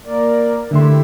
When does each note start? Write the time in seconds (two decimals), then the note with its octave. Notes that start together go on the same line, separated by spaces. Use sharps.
0.05 A#3 A#4 D5
0.71 D3 A3 E4 G4 E5 C6